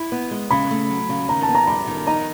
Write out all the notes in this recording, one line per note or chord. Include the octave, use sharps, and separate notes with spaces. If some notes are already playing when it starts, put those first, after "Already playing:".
Already playing: E4
B3
G#3
C#3 B5
A3
F#3
C#3
D#3 A#5
A5
B3
A#5
G3 B5
D#3
D#4 A#5